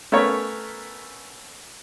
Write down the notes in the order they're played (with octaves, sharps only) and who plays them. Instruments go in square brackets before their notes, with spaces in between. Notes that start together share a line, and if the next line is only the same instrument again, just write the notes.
[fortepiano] A3 B3 C#4 A#4 C#5